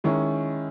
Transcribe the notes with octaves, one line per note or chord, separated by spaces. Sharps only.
D#3 G#3 C#4 E4